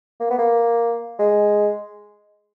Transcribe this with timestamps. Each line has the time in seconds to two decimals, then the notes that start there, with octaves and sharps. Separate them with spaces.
0.20 A#3
0.30 B3
0.38 A#3
1.19 G#3